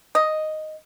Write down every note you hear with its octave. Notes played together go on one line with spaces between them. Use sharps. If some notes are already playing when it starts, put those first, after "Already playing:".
D#5